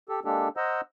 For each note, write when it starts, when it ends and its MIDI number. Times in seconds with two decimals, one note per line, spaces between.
0.09 0.20 67
0.09 0.20 69
0.25 0.48 56
0.25 0.48 58
0.25 0.48 62
0.25 0.48 67
0.25 0.48 69
0.57 0.81 72
0.57 0.81 75
0.57 0.81 78
0.57 0.81 82
0.57 0.81 88